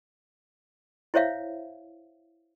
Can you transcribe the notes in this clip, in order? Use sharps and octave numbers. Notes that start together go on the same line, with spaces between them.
E4 C5 C#5 E5 F5